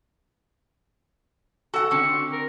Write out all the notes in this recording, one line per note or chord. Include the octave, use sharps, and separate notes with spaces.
F#4 A4 F#5
D3 C4 C#6
A#4